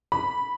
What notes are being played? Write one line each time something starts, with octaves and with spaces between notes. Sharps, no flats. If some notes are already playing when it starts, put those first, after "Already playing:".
B5